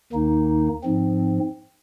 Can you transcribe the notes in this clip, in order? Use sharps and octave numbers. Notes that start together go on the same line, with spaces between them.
D#2 D#3 A#3 D#4
G#2 F3 C4